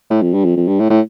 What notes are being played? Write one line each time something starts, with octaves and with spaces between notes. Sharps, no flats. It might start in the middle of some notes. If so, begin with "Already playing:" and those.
A2
F2
G2
F2
F2
G2
A2
A2